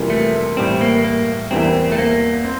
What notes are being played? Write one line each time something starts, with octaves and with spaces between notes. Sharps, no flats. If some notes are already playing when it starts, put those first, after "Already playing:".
Already playing: F2 C3 E3 G3 A#3
A3
A2 E3 G3 C4
A#3
A#3
E2 E3 G3 A#3 C4 E4
A3
A#3
C4